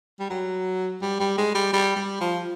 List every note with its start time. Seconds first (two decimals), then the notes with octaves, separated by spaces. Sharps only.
0.20 G3
0.30 F#3
1.02 G3
1.20 G3
1.38 G#3
1.55 G3
1.73 G3
1.96 G3
2.21 F3